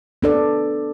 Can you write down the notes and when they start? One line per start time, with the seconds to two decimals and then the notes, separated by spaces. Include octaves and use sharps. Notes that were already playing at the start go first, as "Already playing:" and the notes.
0.23 B3 D4 A4 D5